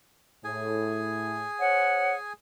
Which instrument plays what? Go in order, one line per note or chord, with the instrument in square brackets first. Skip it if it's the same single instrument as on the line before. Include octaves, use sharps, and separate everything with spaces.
[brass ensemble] A2 [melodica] G#4 G#5
[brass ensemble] C5 C#5 [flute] F#5